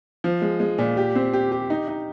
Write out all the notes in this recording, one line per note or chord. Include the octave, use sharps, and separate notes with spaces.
F3
G#3
G#3
A#2
G4
C4
G4
G4
D#4
D#4